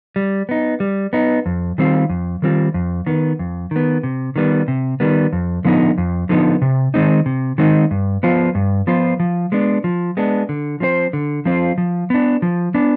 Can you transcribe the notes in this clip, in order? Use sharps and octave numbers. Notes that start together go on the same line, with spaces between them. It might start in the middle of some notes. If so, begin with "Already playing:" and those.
G3
B3 D#4
G3
B3 D#4
F2
D#3 G3 C4 F4
F2
D#3 G3 C4 F4
F2
D#3 B3
F2
D#3 B3
C3
D#3 G3 B3
C3
D#3 G3 B3
F2
D3 F3 B3 D#4
F2
D3 F3 B3 D#4
C3
D#3 G#3 C4 D#4
C3
D#3 G#3 C4 D#4
G2
F3 B3 F4 C5
G2
F3 B3 F4 C5
F3
G#3 B3 D4
F3
G#3 B3 D4
D3
F3 C4 F4 C5
D3
F3 C4 F4 C5
F3
B3 D4
F3
B3 D4